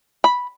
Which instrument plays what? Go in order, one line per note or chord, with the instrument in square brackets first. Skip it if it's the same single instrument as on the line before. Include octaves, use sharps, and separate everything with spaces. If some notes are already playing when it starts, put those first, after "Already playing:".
[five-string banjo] B5